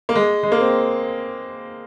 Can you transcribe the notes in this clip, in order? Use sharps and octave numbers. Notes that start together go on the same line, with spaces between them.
A#3
G#3
G#3
A#3
C4